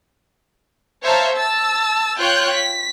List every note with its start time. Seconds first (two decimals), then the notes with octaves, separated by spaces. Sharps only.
1.03 C5 C#5 E5 F5 A5 A#5
1.35 A5 E6 A6
2.18 F4 C#5 G5 F#6 G6
2.54 B6